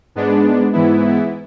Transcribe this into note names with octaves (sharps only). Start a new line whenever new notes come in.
G#2 G#3 B3 D4
G#2 E3 B3 E4